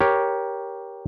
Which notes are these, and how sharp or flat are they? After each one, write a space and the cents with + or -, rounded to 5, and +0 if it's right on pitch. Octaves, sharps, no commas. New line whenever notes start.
G4 +0 A#4 +15 C#5 +0